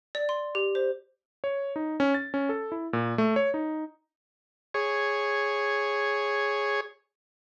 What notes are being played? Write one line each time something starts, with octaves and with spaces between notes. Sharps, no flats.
D5
C6
G4
C5
C#5
D#4
C#4
A6
C#4
A4
E4
A#2
A3
C#5
D#4
G#4 C#5